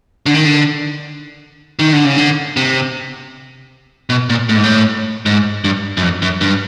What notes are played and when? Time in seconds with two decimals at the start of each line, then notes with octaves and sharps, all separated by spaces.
0.26 D3
0.35 D#3
0.45 D3
1.79 D#3
1.93 D3
2.05 C#3
2.18 D3
2.57 C3
4.10 B2
4.30 A#2
4.49 A2
4.56 G#2
4.64 A2
5.26 G#2
5.64 G2
5.97 F#2
6.02 F2
6.22 F#2
6.41 G2